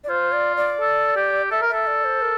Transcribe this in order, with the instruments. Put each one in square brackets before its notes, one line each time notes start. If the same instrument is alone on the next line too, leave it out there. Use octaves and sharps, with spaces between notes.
[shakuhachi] D5
[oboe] F4 [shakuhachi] C5
[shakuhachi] D5
D5
[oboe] A4
G4
[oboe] A4 [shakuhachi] E5
[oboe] A#4
[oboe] A4 [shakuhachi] E5
[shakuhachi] D5
C5
A#4